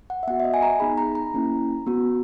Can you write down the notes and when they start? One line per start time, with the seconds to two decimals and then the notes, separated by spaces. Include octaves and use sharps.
0.10 F#5
0.23 E5
0.27 B3 F#4 F#5
0.40 E5
0.44 D#5
0.54 G#5
0.63 A#5
0.80 B3 D#4 G#4 B5
0.98 A#5
1.15 A#5
1.34 A#3 C#4 E4
1.86 B3 F#4